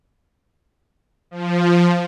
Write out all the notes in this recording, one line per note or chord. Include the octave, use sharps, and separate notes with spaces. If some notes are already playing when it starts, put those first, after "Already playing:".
F3